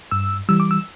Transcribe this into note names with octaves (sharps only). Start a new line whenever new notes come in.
G2 E6
E3 G3 E6
D6
E6